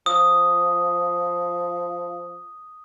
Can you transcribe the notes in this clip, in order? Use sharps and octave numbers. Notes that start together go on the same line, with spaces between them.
F3 D#6